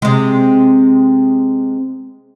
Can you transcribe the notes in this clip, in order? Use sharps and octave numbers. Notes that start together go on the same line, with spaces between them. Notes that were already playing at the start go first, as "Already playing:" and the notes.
C3 G#3